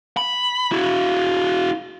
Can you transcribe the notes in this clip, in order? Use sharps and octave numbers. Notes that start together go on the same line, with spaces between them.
B5
E4 F#4